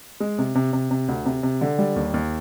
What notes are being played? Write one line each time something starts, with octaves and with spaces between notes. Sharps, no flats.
G#3
C3
C3
C3
C3
D2
C3
C3
D3
G3
D#2
D#2